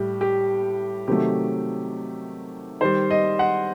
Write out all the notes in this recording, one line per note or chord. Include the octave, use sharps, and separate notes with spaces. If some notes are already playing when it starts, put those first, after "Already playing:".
Already playing: A2 G3 G4
G4
C3 D#3 F#3 A3 G4
D#3 G3 C5
D#5
F#5